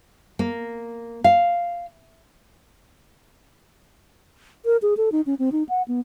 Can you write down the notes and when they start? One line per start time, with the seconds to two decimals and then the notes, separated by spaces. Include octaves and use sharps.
0.39 A#3
1.24 F5
4.65 A#4
4.82 G#4
4.97 A4
5.12 D#4
5.26 C#4
5.39 C4
5.52 D#4
5.69 F#5
5.88 B3